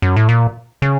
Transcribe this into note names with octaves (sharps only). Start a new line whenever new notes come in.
F#2
A2
A#2
C#3